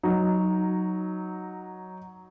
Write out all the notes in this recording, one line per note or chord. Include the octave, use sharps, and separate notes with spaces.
F#3 D#4